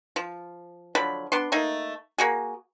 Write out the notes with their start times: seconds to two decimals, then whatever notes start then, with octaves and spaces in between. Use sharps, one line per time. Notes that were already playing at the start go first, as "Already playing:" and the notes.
0.16 F3
0.95 D3 F3 F#3 B5
1.32 B3 D4 C6
1.52 A3 A#3 D#4
2.18 A#3 F#4 G#4